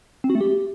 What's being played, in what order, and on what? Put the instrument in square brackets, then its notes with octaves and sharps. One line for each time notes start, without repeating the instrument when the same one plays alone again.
[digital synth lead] C4
F#4
A3
G4